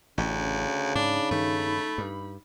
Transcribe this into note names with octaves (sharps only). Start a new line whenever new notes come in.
A1 D2 C#3
G#2 D4 D#4 B5
G2 D#3 A3
G2